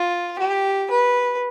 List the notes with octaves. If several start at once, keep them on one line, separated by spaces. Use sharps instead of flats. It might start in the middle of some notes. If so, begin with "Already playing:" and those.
Already playing: F4
G4
B4